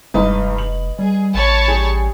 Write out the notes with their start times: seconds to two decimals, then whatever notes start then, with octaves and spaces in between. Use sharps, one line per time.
0.14 F1 G2 G#3 D#4 B4 D#5
0.58 F#7
0.99 G3 G#4
1.34 A1 C#5 A5 B5
1.68 G3 G#4